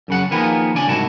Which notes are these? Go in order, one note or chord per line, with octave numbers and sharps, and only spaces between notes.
F#2 C#3 F#5
D#3 F3 A#3 B3 G#4 B4
C#3 D4 D5 G#5
C2 G#2 E4 F#4 A5